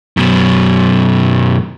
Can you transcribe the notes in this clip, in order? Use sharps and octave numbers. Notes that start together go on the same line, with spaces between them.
F#2 B2